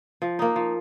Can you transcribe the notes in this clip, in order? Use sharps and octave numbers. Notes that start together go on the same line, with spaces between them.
F3
A#3 D#4
F3